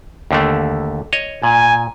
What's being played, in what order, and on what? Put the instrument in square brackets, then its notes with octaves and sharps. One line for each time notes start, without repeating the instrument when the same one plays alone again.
[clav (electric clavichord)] D#2 D3 A3
C#5 D#5
[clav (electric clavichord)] A#2 [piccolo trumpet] G#5